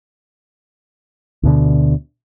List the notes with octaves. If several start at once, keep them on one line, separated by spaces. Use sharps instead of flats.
D2 B2 D3